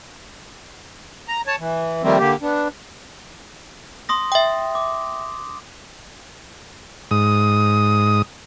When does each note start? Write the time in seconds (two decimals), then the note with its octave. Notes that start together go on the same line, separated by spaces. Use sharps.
1.28 A#5
1.47 C#5 A5
1.60 E3
2.03 D#3 F3 G3 A3 A#3 C4
2.18 D3 A#3 G4
2.42 B3 D4
4.09 C6 D#6 A#6
4.32 E5 G5
4.75 D6
7.11 G#2 D#6